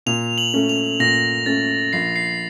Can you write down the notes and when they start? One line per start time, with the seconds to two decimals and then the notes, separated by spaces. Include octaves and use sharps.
0.06 A#2 F7
0.38 F#7
0.54 A3 C#4
0.69 F7
1.00 A#2 A#6
1.46 A3 C#4 A6
1.93 A#1 C7
2.16 C7